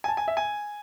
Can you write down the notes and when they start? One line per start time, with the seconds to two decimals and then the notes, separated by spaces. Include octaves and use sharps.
0.04 G#5
0.08 A5
0.17 G#5
0.28 E5
0.37 G#5